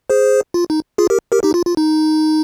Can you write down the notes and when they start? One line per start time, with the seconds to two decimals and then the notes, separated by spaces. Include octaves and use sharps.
0.10 G#4 C5
0.54 F4
0.70 D#4
0.98 F4 G#4
1.10 G4 A#4
1.32 G4 A#4
1.43 D#4 G4
1.54 F4
1.66 F4
1.77 D#4